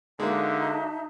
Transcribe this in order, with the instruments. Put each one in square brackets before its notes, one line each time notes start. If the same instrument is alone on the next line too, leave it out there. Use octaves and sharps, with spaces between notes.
[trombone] D3 [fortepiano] G#3 A#3 [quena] D#4 [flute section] F#4 E5 A5